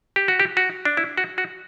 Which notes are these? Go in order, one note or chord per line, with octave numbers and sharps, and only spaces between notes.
G4
F#4
G4
F#4
D4
E4
F#4
F#4